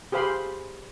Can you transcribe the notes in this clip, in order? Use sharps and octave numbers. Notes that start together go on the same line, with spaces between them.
G4 G#4 C5 F5 B5 C6